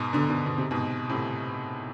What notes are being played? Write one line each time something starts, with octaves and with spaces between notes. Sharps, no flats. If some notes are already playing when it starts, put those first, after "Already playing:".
Already playing: G#2 B2
B2 D3
B2 D3
B2
C3
G#2 B2
A2 C3